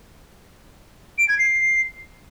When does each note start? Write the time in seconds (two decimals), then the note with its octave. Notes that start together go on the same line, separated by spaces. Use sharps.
1.18 D7
1.29 G#6
1.39 C7